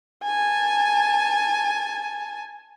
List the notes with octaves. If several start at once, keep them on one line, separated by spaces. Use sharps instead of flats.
G#5 A5